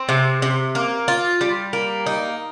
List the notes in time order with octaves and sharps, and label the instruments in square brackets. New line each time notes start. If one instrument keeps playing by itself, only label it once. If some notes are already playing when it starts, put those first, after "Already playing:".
Already playing: [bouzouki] C4
C3
C3
A#3
F4
G3
A#3
D#4